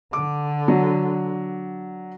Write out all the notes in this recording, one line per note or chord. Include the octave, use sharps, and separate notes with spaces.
D3 D6
F#3 D4